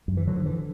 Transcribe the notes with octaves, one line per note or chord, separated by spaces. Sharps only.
F#2
E3
D3 F#3
F3
D3 E3